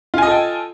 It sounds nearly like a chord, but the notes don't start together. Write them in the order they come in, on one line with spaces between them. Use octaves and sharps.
F4 G#5 D#5 A4 G5